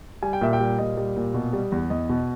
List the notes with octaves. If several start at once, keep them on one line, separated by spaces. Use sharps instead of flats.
G3 G#5
G5
A#2 E5
G5
G3
A#2 D#5
G3
A#2
B2
G3
E2
E2 D#5
B2